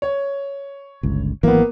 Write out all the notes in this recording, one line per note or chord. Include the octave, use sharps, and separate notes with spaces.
C#5
G1 C#2
G#1 E3 F#3 A#3 B3